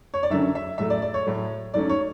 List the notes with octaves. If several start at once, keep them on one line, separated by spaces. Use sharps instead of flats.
C#5
D5
F#2 D3 F#3 C#4 E5
E5
A2 F#3 A3 E5
D5
D5
C#5
A2 F#3 A3
G#2 F#3 A3 C#4 D5
C#5